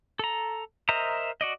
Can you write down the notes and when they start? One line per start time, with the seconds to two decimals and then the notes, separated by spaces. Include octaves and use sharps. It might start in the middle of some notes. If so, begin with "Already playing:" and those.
0.19 A4 A#5
0.89 A#4 C5 D#5 E5 A#5
1.41 F#4 D5 D#5